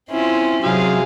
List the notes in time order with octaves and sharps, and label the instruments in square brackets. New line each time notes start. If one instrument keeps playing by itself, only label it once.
[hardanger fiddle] C4 C#4 [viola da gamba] E4 F4
[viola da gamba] C3 [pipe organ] F#3 [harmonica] G#3 G#4 F5